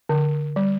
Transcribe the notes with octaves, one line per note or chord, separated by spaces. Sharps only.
D3
G3